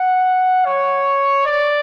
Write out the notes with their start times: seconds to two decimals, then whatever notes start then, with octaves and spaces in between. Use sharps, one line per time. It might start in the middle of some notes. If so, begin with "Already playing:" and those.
Already playing: F#5
0.65 C#5
1.46 D5